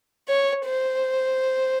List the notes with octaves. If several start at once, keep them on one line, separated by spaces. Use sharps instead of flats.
C#5
C5